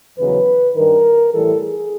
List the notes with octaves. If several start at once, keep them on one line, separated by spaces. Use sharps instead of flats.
E2 C#3 F#3 B4
G2 D#3 G3 A#4
A2 E3 G3 A4
G#4